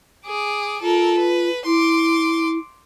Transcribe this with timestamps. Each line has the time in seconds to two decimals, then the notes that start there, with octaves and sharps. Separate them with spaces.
0.26 G#4 D6
0.82 F4 A4 A#4
1.18 B4
1.66 E4 C6 D6